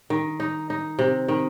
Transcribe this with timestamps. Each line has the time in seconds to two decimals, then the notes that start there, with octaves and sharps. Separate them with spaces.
0.10 D#3
0.40 D#4
0.70 D#4
0.99 C3
1.28 D#3